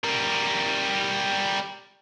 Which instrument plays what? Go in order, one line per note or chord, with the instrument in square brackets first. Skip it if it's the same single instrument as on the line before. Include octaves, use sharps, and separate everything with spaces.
[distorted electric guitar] G3 A#4